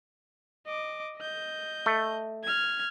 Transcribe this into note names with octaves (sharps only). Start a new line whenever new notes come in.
D#5 D6
D#5 G6
A3
F6 G#6